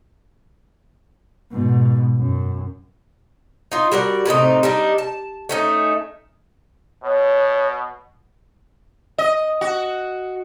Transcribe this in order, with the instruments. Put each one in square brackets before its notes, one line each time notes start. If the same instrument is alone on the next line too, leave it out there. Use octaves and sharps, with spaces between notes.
[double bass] G#2 B2
F#2
[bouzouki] D#4 F4
G3 F#4 A#4 D5
A2 C3 C4 D#4
G3 D4 D#4
A5
A3 C#4 D#4
[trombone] B2 [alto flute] C#5
[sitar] D#5
F#4